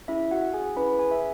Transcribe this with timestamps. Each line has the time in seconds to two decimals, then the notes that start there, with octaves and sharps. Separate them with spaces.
0.08 C#4 E4 G#4 E5
0.31 F#4 F#5
0.54 G#4 G#5
0.76 C#4 E4 G#4 B4 B5
0.99 G#4 G#5
1.11 E5